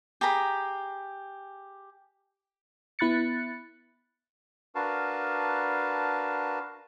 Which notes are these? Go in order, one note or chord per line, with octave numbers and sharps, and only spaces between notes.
G4 G#4 A#5 B5
B3 E4 B5 F#6 A6 C#7
D4 F#4 A#4 B4 F5 A5